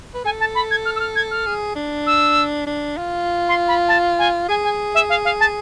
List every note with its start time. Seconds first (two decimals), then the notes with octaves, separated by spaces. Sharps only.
0.14 B4
0.24 A4 G#5
0.40 A5
0.55 B5
0.71 G#6
0.85 F6
0.96 E6
1.00 F6
1.16 G#6
1.31 F6
1.46 G#4
1.76 D4
2.06 E6
2.67 D4
2.97 F4
3.48 C6
3.68 B5
3.88 A5
4.19 G#5
4.48 G#4 G#5
4.64 G#5
4.94 E5
5.10 F5
5.25 F5
5.40 A5